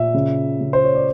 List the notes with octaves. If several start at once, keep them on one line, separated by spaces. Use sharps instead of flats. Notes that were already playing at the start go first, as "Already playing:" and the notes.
Already playing: A#2 E5
C#3
C#3
C5
C#5
D5